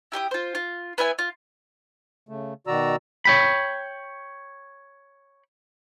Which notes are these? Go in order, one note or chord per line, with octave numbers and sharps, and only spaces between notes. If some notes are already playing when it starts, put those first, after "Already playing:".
E4 G4 G5 D#6
F4 C5
F4
B3 E4 E5 G#5
F4
C#3 A3
B2 D#3 F#4 D5 A#5 E6
C#5 G5 B5